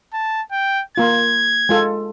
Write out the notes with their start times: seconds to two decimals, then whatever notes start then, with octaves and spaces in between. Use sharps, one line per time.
0.13 A5
0.52 G5
0.98 A#3 F4 G#6
1.69 G#3 F4 A4